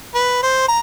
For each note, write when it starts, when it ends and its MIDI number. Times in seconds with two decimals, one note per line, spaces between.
0.14 0.41 71
0.43 0.65 72
0.68 0.80 82